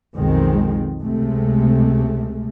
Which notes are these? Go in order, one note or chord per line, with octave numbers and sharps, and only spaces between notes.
B1 F2 D#3 G#3 C4
C#2 C3 G#3 A3